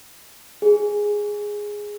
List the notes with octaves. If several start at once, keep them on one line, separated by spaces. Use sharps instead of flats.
G#4